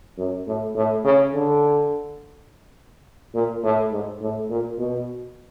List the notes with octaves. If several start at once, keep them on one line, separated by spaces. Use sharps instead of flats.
F#2
A2
A2
C#3
D3
A#2
A2
G#2
A2
A#2
B2